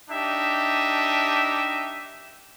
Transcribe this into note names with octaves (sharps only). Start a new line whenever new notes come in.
D4 D#4 G4 E5